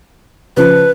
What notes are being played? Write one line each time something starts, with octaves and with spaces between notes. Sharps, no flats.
C#3 F3 B4